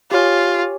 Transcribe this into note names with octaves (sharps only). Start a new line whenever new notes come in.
F4 G4 C#5 G#5